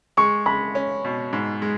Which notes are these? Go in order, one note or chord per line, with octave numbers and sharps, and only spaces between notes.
G#3 C#6
G#3 B5
C#4
B2
G#2
G#3